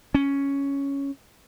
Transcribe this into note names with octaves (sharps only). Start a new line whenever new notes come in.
C#4